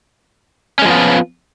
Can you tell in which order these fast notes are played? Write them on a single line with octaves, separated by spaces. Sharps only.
C#4 G#3 F3 B3 F4